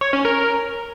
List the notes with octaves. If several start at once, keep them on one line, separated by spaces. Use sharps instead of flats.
C#5
C#4
A#4